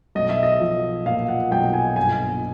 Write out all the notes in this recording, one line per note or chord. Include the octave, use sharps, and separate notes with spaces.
B1 D#5
E5
D#5
F3
A#2 F5
F#5
B1 G5
G#5
G1 G#5